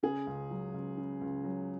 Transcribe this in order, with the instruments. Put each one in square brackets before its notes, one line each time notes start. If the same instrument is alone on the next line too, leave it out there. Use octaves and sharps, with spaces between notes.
[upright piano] C#3 G#4
C#2
F#3
C#2
C#3
C#2
F#3